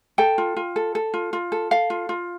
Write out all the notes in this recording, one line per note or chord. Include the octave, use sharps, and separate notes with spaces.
A4 G5
F4
F4
A4
A4
F4
F4
A4
A4 F5
F4
F4